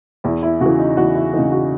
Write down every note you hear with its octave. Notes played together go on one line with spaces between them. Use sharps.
E2 E4
E4
C#3 F#4
E3
D#4
E2 F#4
E4
C#3 E3 D#4
F#4